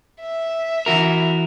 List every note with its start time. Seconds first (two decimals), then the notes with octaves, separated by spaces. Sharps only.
0.20 E5
0.86 E3 F#4 A#4